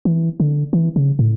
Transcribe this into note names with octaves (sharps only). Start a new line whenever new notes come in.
E3
D3
E3
C#3
A2